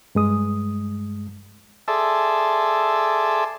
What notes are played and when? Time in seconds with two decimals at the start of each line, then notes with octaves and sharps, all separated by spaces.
0.15 G2 G#3 D#6
1.88 G#4 A4 D5 E5 A5 C6